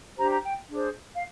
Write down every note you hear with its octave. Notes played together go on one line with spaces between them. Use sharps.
D4 G4 C5 A#5
A#5
G5
D4 G#4 C5
F5